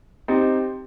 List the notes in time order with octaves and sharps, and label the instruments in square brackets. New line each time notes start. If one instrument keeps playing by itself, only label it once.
[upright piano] C4 D#4 [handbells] G4